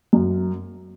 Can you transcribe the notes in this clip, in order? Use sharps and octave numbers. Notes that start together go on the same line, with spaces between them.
F#2